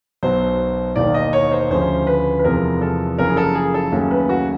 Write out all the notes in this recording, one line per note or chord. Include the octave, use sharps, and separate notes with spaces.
B1 B2 F#3 C5
E1 D#2 D#3 D5
D#5
C#5
C5
D2 C#3 F3 A3 C#4 C5
B4
B4
E2 C3 F3 G#3 B3 A#4
A4
F#1 F#2 C#3 F3 A#4
G#4
A4
G#4
A4
D#2 C#3 F#3 A3 C#4
B4
F#4